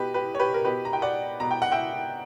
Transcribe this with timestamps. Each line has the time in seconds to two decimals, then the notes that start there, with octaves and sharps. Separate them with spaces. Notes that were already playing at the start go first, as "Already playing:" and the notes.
Already playing: B2 G4 B4
0.14 G4 B4
0.35 C#5
0.39 G4 B4
0.54 A#4
0.65 B2 G4 B4
0.85 A#5
0.93 G5
1.02 D5 F#5
1.40 B2 A#5
1.51 G5
1.62 F#5
1.72 E5 G5